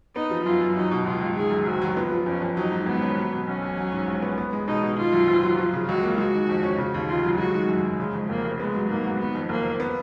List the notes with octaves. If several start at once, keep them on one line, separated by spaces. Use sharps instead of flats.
B3 D#4
F3
F#2 F4
F#2
F#3 D#4
B2
C#2 F4
C#2
D#3 G#4
F#2
F#1 F#4
F#3
B3 F4
F3
F2 C#4
F2
F#3 D#4
G#2
G#1 B3
C#4
F#3
B2
B1 C#4
B1
F#3
G#2
A#1
B3
B3
G#3
B2 D#4
B2
D#3 F4
F#2
F#1
F#3
F3
C#3
C#2 F#4
A#3
G#3 F#4
D#3
F2
C#4
C#3
D#2
F1 F4
F#3
G#3 F#4
D#3
F#2
F#2
C#3 G#3
F2
F1 A#3
F1
G#3 B3
F#3
G#2 A#3
F#4
D#3 B3
F2
F#1 A#3
F#1
B3